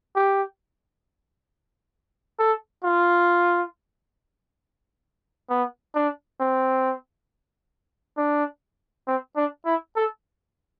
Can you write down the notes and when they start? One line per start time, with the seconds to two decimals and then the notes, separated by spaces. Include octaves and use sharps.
0.15 G4
2.39 A4
2.84 F4
5.50 B3
5.95 D4
6.40 C4
8.17 D4
9.07 C4
9.36 D4
9.66 E4
9.96 A4